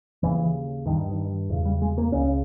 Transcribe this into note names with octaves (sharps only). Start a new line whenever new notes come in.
D#2 C#3 E3
G2 D#3
D#3
E2 C#3 E3
G3
G#3
A#3
C#2 C#3 C#4